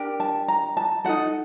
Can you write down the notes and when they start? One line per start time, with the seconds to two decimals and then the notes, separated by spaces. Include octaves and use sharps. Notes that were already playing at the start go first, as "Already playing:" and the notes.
Already playing: D4 G4 A#4
0.20 A5
0.48 A#5
0.77 A5
1.04 D#4 F#4 A4 F#5